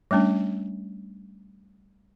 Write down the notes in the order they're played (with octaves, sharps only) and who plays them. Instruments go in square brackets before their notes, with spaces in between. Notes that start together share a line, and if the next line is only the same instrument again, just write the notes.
[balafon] G3 A3 C#4 D4